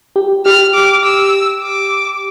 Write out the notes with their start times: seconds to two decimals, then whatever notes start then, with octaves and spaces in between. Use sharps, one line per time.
0.16 G4
0.46 G4 F6
0.74 D6
1.04 E6
1.63 D6